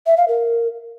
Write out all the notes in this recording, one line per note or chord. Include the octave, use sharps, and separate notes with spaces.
E5
F5
A#4